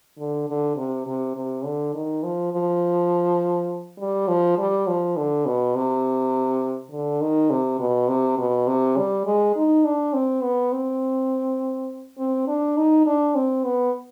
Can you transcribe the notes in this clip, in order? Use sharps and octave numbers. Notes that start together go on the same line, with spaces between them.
D3
D3
C3
C3
C3
D3
D#3
F3
F3
G3
F3
G3
F3
D3
B2
C3
D3
D#3
C3
B2
C3
B2
C3
G3
G#3
D#4
D4
C4
B3
C4
C4
D4
D#4
D4
C4
B3